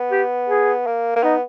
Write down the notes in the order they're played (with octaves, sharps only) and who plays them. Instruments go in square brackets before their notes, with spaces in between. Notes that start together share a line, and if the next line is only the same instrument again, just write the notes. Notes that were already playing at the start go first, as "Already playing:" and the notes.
Already playing: [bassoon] B3
[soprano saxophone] G4
G#4
[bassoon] A#3
A#3
[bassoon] B3 [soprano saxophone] D#4